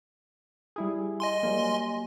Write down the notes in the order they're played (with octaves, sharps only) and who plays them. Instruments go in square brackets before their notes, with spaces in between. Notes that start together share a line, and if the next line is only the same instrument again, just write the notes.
[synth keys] G3 E4 G#4
[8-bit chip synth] D#5 G#5 C6
[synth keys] F#3 G3 A#3